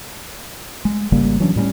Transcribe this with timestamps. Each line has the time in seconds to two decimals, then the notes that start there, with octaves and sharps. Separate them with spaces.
0.85 G#3
1.12 G#1 C#3 G3 A#3
1.40 E3 F#3 C#4 D4
1.56 A2 G3 B3 C#4